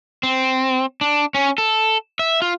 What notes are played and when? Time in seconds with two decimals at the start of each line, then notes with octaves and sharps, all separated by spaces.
0.23 C4
1.01 D4
1.35 C#4
1.58 A4
2.19 E5
2.42 F4